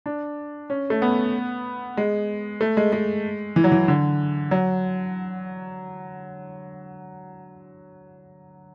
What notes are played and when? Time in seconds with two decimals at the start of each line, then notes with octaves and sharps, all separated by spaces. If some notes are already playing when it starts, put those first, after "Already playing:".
0.06 D4
0.70 C#4
0.90 A3
1.02 B3
1.97 G#3
2.61 A3
2.77 G#3
2.92 G#3
3.56 E3
3.64 F#3
3.72 E3
3.88 D3
4.51 F#3